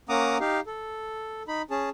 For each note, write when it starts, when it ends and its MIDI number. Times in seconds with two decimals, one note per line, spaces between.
0.09 0.38 58
0.09 0.38 61
0.09 0.38 78
0.09 0.38 82
0.09 0.38 86
0.09 0.38 87
0.40 0.60 63
0.40 0.60 67
0.40 0.60 77
0.67 1.43 69
1.48 1.62 63
1.48 1.62 83
1.71 1.90 61
1.71 1.90 68
1.71 1.90 81